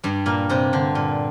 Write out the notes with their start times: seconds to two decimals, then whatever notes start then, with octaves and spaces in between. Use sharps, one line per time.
0.04 G2 G3
0.26 A#2 A#3
0.50 C3 C4
0.73 D3
0.95 A#2